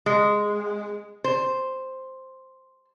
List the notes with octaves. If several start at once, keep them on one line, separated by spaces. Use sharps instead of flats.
G#3
C5